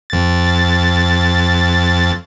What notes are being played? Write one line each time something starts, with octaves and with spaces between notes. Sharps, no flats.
F2 A6